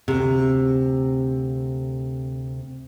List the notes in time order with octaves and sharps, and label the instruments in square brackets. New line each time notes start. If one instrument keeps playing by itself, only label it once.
[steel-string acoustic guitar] D2 C3